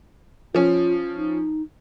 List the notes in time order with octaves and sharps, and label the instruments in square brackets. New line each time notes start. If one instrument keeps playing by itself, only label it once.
[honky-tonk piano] F3 C#4 [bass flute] F4
[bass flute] D#4